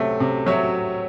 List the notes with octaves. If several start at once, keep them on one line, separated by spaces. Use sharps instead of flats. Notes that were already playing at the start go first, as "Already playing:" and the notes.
Already playing: C3 F#3 A3
C3
F#3 C#5 E5